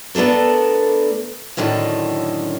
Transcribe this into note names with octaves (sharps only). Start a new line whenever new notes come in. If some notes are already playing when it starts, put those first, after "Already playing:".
A3 B3 D4 A4 A#4
F#2 A2 D3 D#3 C#4